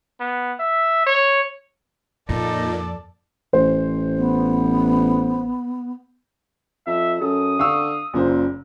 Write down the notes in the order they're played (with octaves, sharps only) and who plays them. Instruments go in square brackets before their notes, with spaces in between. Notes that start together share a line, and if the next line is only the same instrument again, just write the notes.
[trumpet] B3
E5
C#5
[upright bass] F2 [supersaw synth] A#2 [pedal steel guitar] D#4 [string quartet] A4 D5
[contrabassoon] A1 [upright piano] C5
[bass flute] B3
[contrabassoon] F2 [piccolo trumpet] E5
[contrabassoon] F#2 [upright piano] A4 [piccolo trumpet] D#6
[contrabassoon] D3 [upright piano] F5 C#6 E6
[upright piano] F#1 C#3 C5 [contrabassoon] A#2